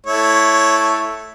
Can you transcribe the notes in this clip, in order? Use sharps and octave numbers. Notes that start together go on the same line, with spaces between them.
A3 E4 C#5